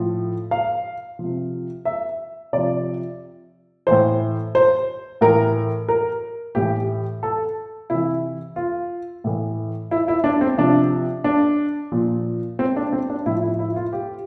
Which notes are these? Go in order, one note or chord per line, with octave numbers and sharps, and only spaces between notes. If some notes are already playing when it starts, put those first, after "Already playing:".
Already playing: A2 F3
F5
C3 F3
E5
C3 F3 D5
A2 E3 C5
C5
A2 E3 A#4
A#4
A2 E3 G4
A4
C3 E3 E4
F4
A2 E3
E4
E4
D4
C4
C3 F3 D4
D4
A#2 F3
C4
D4
C4
D4
A2 F3 E4
E4
E4
F4
G4